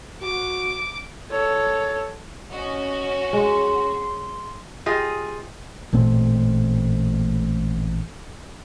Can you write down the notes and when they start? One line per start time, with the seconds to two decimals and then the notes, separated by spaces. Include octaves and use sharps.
0.22 F#4 D6
1.30 A4 C#5
2.51 C#4 F#4 D#5
3.33 G#3 C6
4.86 F4 G4 G#4 D#5
5.93 A1 A#2 A3 C4